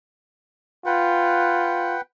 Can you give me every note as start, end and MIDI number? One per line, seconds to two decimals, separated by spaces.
0.86 1.96 65
0.86 2.01 71
0.86 2.01 78
0.86 2.01 79